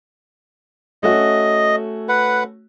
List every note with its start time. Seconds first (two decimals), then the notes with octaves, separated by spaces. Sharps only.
1.03 A3 C#4 F#4 D#5
2.09 B4 F#5